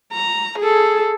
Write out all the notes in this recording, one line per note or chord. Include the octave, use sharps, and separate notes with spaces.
A#5
G#4 A4